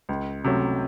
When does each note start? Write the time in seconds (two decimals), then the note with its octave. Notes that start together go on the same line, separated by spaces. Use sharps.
0.09 C#2
0.44 C3 F#3 A3 C#4